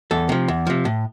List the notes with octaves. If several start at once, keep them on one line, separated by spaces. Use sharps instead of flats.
E2 A4
C3 F3
E2
C3 F3
A2